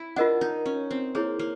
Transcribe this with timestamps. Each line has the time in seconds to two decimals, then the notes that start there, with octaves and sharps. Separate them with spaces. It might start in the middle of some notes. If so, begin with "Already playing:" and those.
Already playing: E4
0.16 D4 F4 A#4 D#5 F#5
0.41 D#4
0.66 C#4
0.91 C4
1.15 A#3 E4 G#4 C#5
1.39 A#3